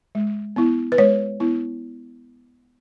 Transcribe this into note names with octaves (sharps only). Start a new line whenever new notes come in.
G#3
B3 E4
B4
G#3 C#5
B3 E4